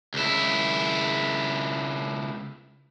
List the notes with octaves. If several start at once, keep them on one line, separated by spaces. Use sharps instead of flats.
C#2 E4